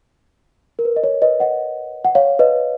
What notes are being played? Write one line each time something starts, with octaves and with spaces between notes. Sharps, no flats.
A#4
B4
D#5
C#5
B4 D#5
D#5 F#5
F#5
C#5 F5
B4 D#5